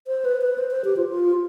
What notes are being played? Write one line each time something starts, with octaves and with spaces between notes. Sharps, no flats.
C5
B4
B4
C5
C5
G4
F4
F4